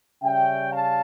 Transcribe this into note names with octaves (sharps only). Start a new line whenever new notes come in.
C#3 G3 C#4 E5 G5
F5 A5